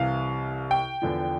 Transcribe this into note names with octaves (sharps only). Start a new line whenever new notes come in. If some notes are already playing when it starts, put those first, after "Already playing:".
Already playing: C2 C3 E3 F5
G5
E2 D3 F3